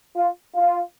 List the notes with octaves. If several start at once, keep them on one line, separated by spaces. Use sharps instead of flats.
F4
F4